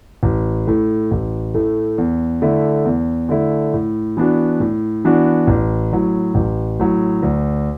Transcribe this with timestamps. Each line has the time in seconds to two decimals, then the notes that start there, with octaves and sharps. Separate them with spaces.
0.23 A1
0.67 A2 A3
1.11 A1
1.54 A2 A3
1.98 E2
2.42 D3 A3 E4
2.85 E2
3.29 D3 A3 E4
3.74 A2
4.17 E3 B3 D4 F#4
4.60 A2
5.05 E3 B3 D4 F#4
5.47 A1
5.92 A2 F#3
6.35 A1
6.80 A2 F#3
7.23 D2